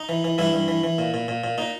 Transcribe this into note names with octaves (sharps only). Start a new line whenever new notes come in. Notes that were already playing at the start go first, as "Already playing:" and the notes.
Already playing: D#4
E3
E3
G2 E3 E4
G2
E3
E3
A#2
A#2
A#2
A#2
A#2 D#4